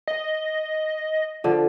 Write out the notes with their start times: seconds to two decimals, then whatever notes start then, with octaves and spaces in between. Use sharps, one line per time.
0.08 D#5
1.44 D3 F3